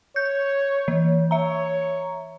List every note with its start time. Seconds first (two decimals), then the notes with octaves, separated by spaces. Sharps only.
0.16 C#5 G6
0.88 E3
1.31 C#5 E5 A#5